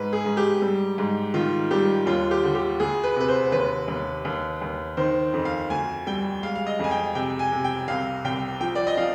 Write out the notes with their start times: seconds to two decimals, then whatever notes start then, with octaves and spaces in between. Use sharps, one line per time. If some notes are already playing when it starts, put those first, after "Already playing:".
Already playing: G#2 G#3 B4
0.13 G#4
0.25 G#2
0.37 G4
0.62 G3
0.98 G#2
1.34 D#3 F4
1.71 G3 G4
2.06 D#2 F4
2.31 G4
2.43 D3
2.55 G4
2.80 D2 G#4
3.03 B4
3.16 C3 B4
3.28 C5
3.52 D#2 B4
3.88 D#2
4.25 D#2
4.61 D#2
4.97 D#3 C5
5.33 F2
5.45 F5
5.70 D2 G#5
6.07 G3 G5
6.43 G#3 F5
6.55 F5
6.67 D#5
6.79 F2 G#5
6.91 G5
7.15 C3 G5
7.39 G#5
7.52 C3
7.64 G5
7.88 C2 F5
8.24 C2 G5
8.60 F3 G5
8.75 D5
8.87 D#5
8.97 F3 F5